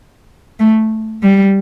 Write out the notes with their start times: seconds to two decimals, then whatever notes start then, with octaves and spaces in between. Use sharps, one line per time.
0.60 A3
1.23 G3